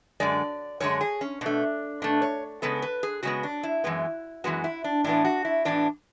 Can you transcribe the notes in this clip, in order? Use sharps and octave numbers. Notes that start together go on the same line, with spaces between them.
F#2 D3 G#3 D5
F#2 D3 G#3 C#5
G#4
C#4
B2 A3 D4
B2 A3 D4
C#5
C#3 G#3 B3 A4
B4
G#4
C#3 G#3 B3 F#4
D4
E4
F#2 E3 G#3 B3
F#2 E3 G#3 B3 F#4
E4
D4
A2 E3 B3 D4
F#4
E4
A2 E3 B3 D4